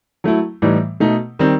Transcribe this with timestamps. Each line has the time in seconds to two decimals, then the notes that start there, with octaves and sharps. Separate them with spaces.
0.24 F#3 A3 E4
0.62 A2 E3 G3 D#4
1.00 B2 A3 D#4
1.39 D#3 G3 C4